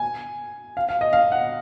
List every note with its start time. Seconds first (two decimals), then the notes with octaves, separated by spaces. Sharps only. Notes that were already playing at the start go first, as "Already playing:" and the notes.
Already playing: G#5
0.77 F5
0.89 F5
1.01 D#5
1.13 F5
1.32 F#5